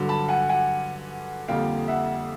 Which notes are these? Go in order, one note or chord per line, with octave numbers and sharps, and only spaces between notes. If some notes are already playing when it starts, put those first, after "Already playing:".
Already playing: G2 D3 F#3
A5 B5
F#5 G#5
F#5 G#5
F2 D3 G3 A#3 F5 G5
E5 F#5